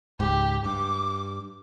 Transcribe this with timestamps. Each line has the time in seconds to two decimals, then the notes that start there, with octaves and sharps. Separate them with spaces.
0.20 C#2 G#2 G4
0.66 G2 D6